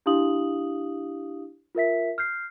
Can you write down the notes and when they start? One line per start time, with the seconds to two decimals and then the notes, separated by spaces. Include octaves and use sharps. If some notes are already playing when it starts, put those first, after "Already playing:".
0.06 D4 E4 G4 F5 D#6 F#7
1.75 F4 A#4 E5 B6
2.18 F6 G6 C7